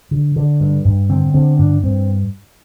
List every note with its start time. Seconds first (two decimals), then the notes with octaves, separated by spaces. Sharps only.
0.11 D3
0.36 D3
0.60 G2
0.85 G2
1.09 D3 C4
1.34 D3 C4
1.59 G2 D4
1.83 G2 C4